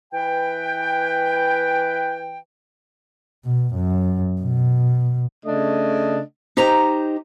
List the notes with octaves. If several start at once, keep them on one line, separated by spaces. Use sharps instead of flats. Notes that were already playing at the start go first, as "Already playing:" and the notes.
E3 B4 G5
B2
F#2
B2
C#3 A3 D4 D#5
D#4 G4 C5 A#5